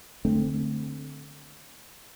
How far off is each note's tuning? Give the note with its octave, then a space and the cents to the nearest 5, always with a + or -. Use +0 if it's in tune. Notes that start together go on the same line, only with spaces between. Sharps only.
D3 +0 A3 +0 C4 +0